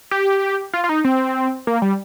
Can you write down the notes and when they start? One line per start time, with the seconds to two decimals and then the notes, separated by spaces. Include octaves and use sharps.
0.11 G4
0.74 F4
0.84 F4
0.89 D#4
1.04 C4
1.67 A#3
1.82 G3